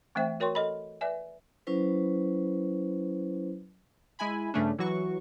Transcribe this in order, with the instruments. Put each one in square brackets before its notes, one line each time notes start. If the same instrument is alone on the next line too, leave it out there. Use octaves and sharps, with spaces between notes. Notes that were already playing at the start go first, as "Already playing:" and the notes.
[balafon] E3 A3 C4 C5 E5 G5
F#4 A#4 C#5 G5 C6 C#6
A4 D#5 B5
B4 D5 E5 G#5
[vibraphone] F#3 C#4 E4 B4 C5
[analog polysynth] G#3 E4 G#5 B5
G2 C#3 A3 C#4 D4
E3 F#3 F#4 C#6